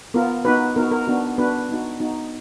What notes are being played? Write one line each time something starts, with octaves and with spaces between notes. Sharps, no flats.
B3 F4 A#4
B3 D#4 F#4 B4
B3 D#4 F#4 A#4
A#4
B3 D4 F#4
B3 D4 F#4 B4
B3 D#4 F#4
B3 D#4 F#4